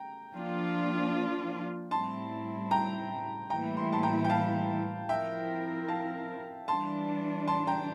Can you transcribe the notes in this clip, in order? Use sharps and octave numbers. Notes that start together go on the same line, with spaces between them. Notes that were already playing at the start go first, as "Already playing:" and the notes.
Already playing: G5 A#5
F3 A#3 D4 F4
A2 G3 C4 E4 A5 C6
G5 A#5
A2 E3 G3 A#3 E4 G5 A#5
C6
A5 C6
G5 A#5
G5
F5 A5
F3 C4 E4 A#4 E5 G5
F5 A5
E3 G3 D4 A5 C6
A5 C6
G5 A#5